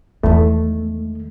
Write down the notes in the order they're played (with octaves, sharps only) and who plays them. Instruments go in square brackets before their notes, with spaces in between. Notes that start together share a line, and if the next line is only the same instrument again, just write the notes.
[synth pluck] E2 [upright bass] D#3 G#3 [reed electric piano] A3